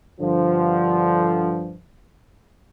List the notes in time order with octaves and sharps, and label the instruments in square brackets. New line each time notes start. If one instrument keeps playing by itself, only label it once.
[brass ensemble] G2 D3 F3